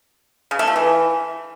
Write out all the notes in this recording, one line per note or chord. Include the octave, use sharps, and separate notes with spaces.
C#3
A3
F3
E3